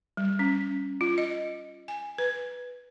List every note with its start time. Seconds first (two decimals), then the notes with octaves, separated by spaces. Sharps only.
0.17 G3
0.39 C#4
1.01 F4
1.18 D#5
1.88 G#5
2.18 B4